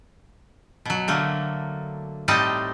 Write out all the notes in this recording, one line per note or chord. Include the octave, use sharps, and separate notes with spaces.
B2 F#3
D3 A3 A#3
A2 G3 C4 D#4 D#5 A5